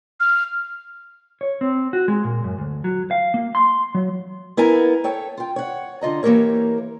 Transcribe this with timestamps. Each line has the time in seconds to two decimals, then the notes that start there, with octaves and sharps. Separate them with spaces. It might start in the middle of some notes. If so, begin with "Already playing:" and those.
0.20 F6
1.41 C#5
1.61 C4
1.93 F#4
2.08 G#3
2.24 A#2
2.44 F#2
2.59 D2
2.84 F#3
3.11 F5
3.34 A#3
3.55 C6
3.95 F#3
4.57 B3 E4 A#4 G#5 A#5
5.04 A4 C#5 G5
5.37 F4 G5
5.56 C#5 F#5
6.01 D3 F4 D#5 A#5
6.23 E3 A#3 C4 G4 A#4 C#5